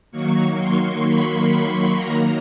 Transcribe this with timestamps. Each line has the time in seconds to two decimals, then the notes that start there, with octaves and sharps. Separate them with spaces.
0.11 D#3 F#3 A#3 C#6
0.58 C6
1.04 B5
1.96 D#3 F#3 A#3 A#5